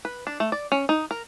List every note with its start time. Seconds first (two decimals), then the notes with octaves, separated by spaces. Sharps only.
0.05 B4
0.27 D4
0.40 A3
0.52 D5
0.72 C#4
0.89 D#4
1.11 A#4